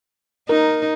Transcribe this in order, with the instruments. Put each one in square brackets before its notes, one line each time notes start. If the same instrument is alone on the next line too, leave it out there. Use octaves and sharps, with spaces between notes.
[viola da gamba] D#4 [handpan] A#4